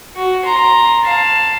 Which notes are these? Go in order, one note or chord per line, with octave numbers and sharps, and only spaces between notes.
F#4
A#5 C6
F5 A5